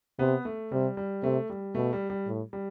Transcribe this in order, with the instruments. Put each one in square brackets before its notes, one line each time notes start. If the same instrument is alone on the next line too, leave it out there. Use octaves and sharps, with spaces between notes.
[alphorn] C3 [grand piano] B3
[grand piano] A3
[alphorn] C3 [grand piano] G3
[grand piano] G3
[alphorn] C3 [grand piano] A3
[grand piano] G3
[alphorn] B2 [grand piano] A3
[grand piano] G3
G3
[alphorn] A2
[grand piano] G3